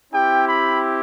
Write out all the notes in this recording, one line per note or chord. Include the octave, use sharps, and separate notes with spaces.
C4 E4 G4 G5
B5